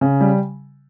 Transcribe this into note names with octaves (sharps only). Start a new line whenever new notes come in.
C#3
G3